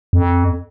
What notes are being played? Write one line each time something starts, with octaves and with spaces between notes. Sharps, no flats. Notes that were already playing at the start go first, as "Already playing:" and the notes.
F2